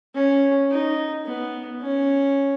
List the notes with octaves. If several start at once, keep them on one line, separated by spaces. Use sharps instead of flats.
C#4
D#4
B3
C#4